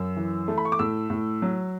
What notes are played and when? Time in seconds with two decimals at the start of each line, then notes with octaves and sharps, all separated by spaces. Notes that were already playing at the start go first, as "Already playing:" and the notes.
Already playing: F#2 E6
0.16 E3
0.48 A3
0.58 B5
0.65 C#6
0.72 D6
0.79 A2 E6
1.10 A2
1.42 F#3